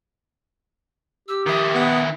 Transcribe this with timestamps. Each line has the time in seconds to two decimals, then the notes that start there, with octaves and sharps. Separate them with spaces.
1.28 G4 E6
1.47 D#3 E4 D#6
1.74 B3